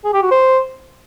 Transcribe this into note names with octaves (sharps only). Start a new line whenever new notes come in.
G#4
G4
F#4
C5